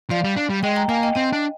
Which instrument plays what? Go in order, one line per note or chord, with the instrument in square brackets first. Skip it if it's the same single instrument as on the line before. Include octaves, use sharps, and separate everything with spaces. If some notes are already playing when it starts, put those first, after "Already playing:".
[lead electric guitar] F3 [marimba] D5 F5
[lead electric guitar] G3
D4
G3
[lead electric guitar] G#3 [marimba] D#5 G5
[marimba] G5 A#5
[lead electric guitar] A#3 [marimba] F5 G#5
[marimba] D#5 G5
[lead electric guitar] C4 [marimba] D#5 G5
[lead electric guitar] D4